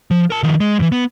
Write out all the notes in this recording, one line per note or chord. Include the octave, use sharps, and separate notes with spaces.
F3
A#4 A5
D#3 F3
G#3
E2 E3
B3